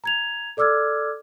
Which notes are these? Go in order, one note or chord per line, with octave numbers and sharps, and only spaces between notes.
A#5 G#6 F7
A4 D5 D6 E6 F6 G#6